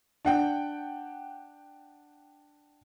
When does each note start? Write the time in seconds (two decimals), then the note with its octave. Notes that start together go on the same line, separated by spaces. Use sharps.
0.25 D4 F#5 G5